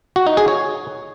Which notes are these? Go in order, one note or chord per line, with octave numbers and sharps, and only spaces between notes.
F#4
D#4
G#4
C#5